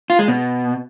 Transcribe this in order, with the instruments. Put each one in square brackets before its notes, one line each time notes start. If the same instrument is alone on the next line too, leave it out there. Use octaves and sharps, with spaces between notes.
[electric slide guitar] F4
G#3
B2